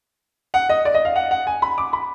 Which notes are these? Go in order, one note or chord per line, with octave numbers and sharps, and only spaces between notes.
F#5
D#5
D5
D#5
F5
F#5
F#5
G#5
B5
D6
B5